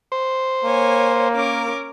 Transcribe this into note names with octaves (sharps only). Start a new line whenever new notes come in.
C5
A#3 C#5 G#5
C#4 A#4 D6